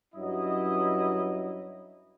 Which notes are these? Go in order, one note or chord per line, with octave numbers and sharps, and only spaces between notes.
G2 F#3 C#4 E4 D#5